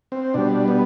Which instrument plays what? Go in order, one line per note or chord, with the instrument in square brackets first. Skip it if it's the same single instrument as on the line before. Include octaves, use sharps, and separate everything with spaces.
[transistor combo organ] C4
B2 G3 D4
B3